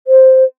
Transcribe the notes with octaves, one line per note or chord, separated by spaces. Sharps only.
C5